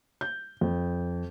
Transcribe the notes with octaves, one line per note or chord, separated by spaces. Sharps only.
G6
F2